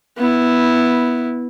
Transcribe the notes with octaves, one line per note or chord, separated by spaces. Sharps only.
B3 E4